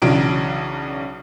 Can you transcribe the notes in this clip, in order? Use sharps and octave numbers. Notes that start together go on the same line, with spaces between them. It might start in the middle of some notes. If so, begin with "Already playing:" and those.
B1 C#3 E3 F#3 D4 D7